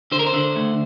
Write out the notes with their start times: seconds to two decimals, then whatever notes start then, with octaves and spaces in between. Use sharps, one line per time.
0.12 D3 C5
0.19 A#4
0.27 C5
0.34 D3
0.56 D2